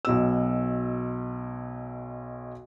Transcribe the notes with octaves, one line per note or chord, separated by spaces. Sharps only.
B1 B2 E6